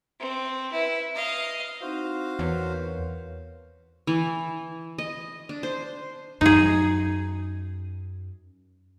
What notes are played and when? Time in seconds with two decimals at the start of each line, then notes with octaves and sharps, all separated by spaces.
0.20 C4
0.72 E4 B4
1.15 D#5 F5
1.81 C4 D#4 E4 F#4 C5 F5
2.39 E2 A#4 B4 C#5
4.07 E3
4.98 D#5
5.49 D4
5.63 C5
6.41 F#2 D#4 G#4